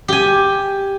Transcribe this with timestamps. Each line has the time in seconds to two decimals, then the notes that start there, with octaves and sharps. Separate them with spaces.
0.08 G4 G#5